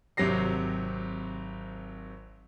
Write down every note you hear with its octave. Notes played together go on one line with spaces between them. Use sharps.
G#1 C3 F#3 G4 A#6 C7